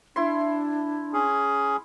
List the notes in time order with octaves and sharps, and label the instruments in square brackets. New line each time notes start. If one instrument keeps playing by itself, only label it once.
[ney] D4 [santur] E4 C6
[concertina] C#4 G#4